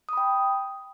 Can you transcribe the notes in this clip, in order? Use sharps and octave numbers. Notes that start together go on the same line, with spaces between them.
G5 B5 D#6